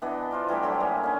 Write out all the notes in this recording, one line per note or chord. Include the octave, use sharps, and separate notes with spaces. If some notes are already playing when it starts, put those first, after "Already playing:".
E3 B3 D4 D#5
D4 F4 C5
E3 G3 A3 G4
D3 F#3 G4
A#3 G#4
C#4 D#4